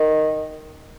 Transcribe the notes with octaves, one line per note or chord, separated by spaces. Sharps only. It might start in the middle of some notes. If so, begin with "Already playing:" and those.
Already playing: D#3